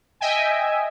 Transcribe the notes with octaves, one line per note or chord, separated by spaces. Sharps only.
D#5 E5 G5 G#5